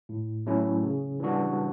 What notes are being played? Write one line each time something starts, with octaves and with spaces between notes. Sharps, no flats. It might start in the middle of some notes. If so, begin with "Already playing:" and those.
A2
F#3 A3 C#4 E4
C#3
E3 G3 D4 F#4